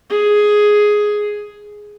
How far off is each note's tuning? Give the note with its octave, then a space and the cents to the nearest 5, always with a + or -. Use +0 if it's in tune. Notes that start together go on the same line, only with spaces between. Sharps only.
G#4 +5